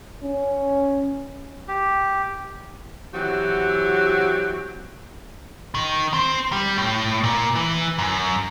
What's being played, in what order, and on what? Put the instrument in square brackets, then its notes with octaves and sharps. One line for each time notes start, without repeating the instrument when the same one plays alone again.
[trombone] C#4
[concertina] G4
[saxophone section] E3 F#3 C4 F#4 G4
[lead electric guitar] D#3
C4
G3
A2
A#2
E3
F#2